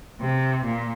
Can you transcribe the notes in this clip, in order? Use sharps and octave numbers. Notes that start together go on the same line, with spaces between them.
C3
A#2